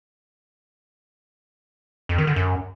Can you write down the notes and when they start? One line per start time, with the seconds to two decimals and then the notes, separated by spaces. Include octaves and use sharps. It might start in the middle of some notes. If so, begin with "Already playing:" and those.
2.09 F2
2.18 D#3
2.27 D3
2.36 F#2